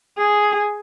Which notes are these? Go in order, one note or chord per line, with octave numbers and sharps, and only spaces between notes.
G#4